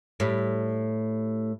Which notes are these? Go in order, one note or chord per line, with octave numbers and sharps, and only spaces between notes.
A2 G3